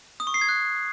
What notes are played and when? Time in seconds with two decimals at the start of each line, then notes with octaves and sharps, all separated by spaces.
0.20 D#6
0.27 C#6
0.34 C7
0.41 G#6
0.49 F#6